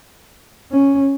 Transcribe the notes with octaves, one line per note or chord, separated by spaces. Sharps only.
C#4